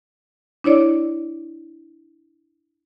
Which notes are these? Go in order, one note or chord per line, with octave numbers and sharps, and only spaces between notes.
D4 E4 C#5 D5